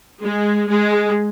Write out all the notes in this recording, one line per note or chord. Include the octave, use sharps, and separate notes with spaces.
G#3
G#3